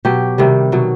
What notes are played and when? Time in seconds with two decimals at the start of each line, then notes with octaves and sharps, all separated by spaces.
0.05 B2 F#3 G4
0.38 C3 D#3 G3
0.72 B2 F#3